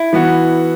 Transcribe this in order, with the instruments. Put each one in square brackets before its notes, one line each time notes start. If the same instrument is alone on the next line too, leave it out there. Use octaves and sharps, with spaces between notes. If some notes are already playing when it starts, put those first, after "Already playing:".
Already playing: [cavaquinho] E4
[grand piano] E3 B3 F#4